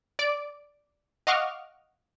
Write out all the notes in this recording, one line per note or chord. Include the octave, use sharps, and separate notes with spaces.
D5 D6 D7
D#5 F5 F#5 C#6 D6 F6